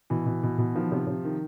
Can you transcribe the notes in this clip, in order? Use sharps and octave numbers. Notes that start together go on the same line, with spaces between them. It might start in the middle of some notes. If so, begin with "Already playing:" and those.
B2 E3
B2
B2
B2
D#3 F3
C3
C3
D#3